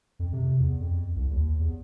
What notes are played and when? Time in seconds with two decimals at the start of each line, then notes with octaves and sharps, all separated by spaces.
0.19 F2
0.33 C3
0.59 E2
0.80 F2
1.16 C2
1.31 D#2
1.59 E2